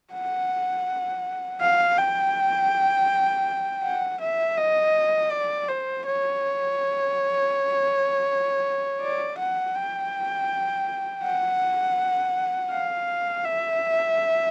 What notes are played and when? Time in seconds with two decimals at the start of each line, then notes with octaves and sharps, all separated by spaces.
0.13 F#5
1.61 F5
1.98 G5
3.83 F#5
4.20 E5
4.57 D#5
5.31 D5
5.68 C5
6.06 C#5
9.02 D5
9.38 F#5
9.76 G5
11.23 F#5
12.72 F5
13.46 E5